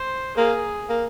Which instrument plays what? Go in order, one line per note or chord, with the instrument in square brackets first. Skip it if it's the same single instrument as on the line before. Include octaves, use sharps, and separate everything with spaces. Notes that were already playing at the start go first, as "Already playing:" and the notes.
Already playing: [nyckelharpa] C5
[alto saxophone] A#3 [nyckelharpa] G#4
[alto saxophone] A#3